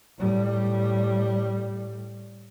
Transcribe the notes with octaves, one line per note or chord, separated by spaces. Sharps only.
A2 G3